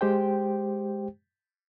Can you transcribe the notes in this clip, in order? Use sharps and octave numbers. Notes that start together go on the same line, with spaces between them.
G#3 G4 C5 G5